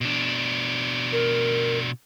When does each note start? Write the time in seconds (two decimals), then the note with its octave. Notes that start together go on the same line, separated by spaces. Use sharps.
0.01 B2 D4
1.12 A#4